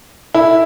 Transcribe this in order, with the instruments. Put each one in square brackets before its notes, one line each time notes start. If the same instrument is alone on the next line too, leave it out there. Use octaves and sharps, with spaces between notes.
[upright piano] E4